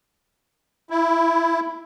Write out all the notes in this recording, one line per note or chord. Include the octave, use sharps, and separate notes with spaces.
E4